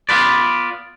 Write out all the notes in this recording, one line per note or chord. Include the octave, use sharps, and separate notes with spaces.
B3 F4 B4 D5